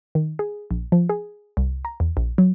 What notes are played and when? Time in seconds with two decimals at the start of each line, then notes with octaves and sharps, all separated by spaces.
0.15 D#3
0.39 G#4
0.71 A#1
0.92 F3
1.09 G#4
1.57 C2
1.85 A#5
2.00 E2
2.17 A#1
2.38 F#3